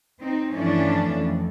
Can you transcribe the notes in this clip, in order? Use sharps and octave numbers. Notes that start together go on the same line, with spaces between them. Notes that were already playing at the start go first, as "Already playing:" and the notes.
C4 D#4
G2 E3 F3 A3 C#4 D4
F2